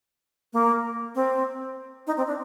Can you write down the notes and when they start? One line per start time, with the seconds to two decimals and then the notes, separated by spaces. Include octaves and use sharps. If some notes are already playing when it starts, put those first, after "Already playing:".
0.53 A#3
1.15 C4
2.07 D#4
2.17 C4
2.27 D4